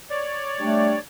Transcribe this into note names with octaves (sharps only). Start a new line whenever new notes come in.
C#5 D5
G3 A3 D4